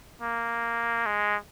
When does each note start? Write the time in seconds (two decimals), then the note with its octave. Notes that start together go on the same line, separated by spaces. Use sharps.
0.22 A#3
1.06 G#3